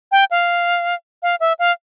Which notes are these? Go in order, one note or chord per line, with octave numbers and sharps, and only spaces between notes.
G5
F5
F5
E5
F5